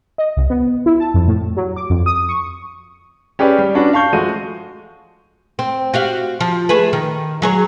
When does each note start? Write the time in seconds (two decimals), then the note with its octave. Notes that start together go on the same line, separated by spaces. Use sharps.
0.18 D#5
0.37 C2
0.50 B3
0.86 E4
1.00 A5
1.14 F2
1.28 A2
1.57 F#3
1.76 D6
1.90 F2
2.06 D#6
2.29 C#6
3.39 C#4 G4 G#4 B4 D5
3.59 G3
3.75 C#4 D4 F#4 B4
3.93 F5 A5 C#6 G6
4.13 F3 G#3 A3 F#4 D#7
5.59 C4
5.94 F#4 G4 F5
6.40 F3
6.69 A3 G#4 B4
6.93 D#3
7.42 F#3 G#4 C#5